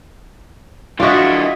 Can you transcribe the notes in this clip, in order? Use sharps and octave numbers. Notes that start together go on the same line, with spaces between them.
E3 D4 F4 F#4 D#5 E5